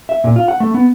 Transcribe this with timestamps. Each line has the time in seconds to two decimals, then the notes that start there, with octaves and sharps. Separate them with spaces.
0.09 E5
0.24 A#2
0.36 F4
0.48 F#5
0.60 A3
0.74 B3